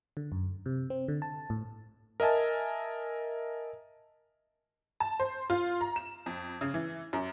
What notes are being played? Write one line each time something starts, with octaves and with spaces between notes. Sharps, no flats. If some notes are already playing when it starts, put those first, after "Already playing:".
D3
F#2
C3
C4
D3
A5
A2
A#4 D#5 E5 G#5 A5
A5
C5
F4
A#5
E7
F2
C#3
E3
F#2